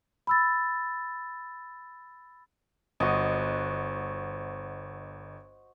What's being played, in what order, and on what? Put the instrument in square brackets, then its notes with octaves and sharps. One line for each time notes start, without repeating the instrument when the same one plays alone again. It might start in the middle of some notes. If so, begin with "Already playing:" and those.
[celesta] B5 E6 A6
[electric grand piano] G1 [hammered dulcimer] F#4 C5 D#5